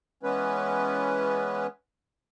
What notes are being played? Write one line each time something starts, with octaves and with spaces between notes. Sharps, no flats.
E3 G#3 B3 C#4 B4